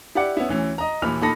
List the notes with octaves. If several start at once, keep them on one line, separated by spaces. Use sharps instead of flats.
E4 G4 D5 F#5
B3 C#4 E4
D2 E3 C#4
D#5 A#5
D#2 A#2 E3 B5 F6 F7
A#2 D#4 A4 B5 A#6